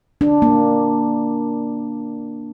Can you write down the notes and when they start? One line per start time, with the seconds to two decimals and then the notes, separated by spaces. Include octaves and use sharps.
0.21 D4
0.42 A#3